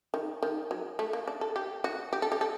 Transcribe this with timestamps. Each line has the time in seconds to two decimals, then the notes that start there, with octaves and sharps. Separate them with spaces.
0.14 D#3
0.43 D#3
0.71 F#3
0.99 A3
1.13 A#3
1.28 D4
1.41 A4
1.56 G4
1.84 F#4
2.13 G4
2.22 A4
2.32 G4
2.41 A4